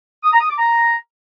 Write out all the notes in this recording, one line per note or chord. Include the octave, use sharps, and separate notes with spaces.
D#6
A#5
D#6
D6
A#5